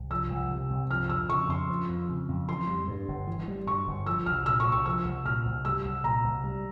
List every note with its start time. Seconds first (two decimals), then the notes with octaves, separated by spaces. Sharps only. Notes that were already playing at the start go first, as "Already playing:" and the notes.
Already playing: C2
0.10 F3 E6
0.30 C2
0.51 C3
0.70 C2
0.90 F3 F6
1.09 F2 E6
1.30 C#3 C#6
1.49 F2 C6
1.70 F3
1.89 F2
2.09 C#3
2.29 F2
2.48 E3 C6
2.67 G3
2.88 G2
3.08 G1
3.27 E3
3.48 G3
3.67 G2 C#6
3.87 G1
4.06 F3 E6
4.26 C2 F6
4.46 A#2 E6
4.60 C#6
4.65 C2
4.72 C#6
4.86 F3 E6
5.05 C2
5.25 A#2 F6
5.46 C2
5.65 G3 E6
5.85 C2
6.04 A#2 A#5
6.24 C2
6.44 G3